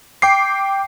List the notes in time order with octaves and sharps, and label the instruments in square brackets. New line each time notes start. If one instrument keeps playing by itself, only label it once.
[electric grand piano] G5 D6 C7